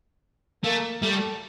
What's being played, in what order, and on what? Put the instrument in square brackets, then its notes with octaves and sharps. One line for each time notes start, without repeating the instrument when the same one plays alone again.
[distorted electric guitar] A3 [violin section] A#3
[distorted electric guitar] G3 [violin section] A3